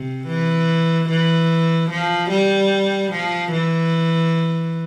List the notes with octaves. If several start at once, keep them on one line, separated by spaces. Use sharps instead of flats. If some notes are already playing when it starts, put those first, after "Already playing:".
Already playing: C3
E3
E3
F3
G3
F3
E3